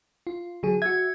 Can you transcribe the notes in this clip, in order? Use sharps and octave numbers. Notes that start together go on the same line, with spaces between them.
F4
D3 F#3 G#4
F#4 E5 G#6